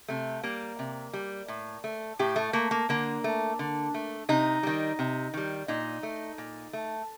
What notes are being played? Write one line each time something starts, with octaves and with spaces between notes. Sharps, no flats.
C3 A3
G3 A#3
C3
G3
A2
A3
A2 G4
A3
A3 A#3
A#3
D3 A#3
A3
D3
A3
C3 D#4
D#3 G3
C3
D#3 G3
A#2 D#4
A3
A#2
A3